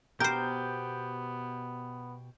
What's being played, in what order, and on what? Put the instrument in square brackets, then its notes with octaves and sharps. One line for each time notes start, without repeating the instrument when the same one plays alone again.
[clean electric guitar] B2 G4 [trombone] B3 [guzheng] A#4 C5 [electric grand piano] G6